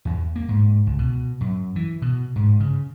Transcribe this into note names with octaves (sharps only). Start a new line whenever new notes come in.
E2
A#3
G#2
C#2
B2
F#2
E3
B2
G#2
C#3